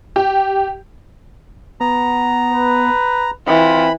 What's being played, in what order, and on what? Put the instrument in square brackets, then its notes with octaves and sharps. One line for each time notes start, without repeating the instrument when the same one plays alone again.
[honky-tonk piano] G4
[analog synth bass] B3 [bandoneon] A#5
[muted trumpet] B4
[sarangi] E3 [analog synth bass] C4 [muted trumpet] F4 [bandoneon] B5